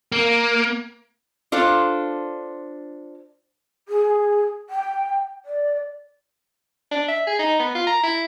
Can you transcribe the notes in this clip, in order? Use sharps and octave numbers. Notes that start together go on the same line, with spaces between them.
A#3
D4 F4 A4 C5
G#4
G5
D5
D4
E5
G#4
D#4
B3
F4
A#5
E4